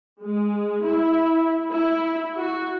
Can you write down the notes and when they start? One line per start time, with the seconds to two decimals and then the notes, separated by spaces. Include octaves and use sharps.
0.23 G#3
0.85 E4
1.70 E4
2.36 F#4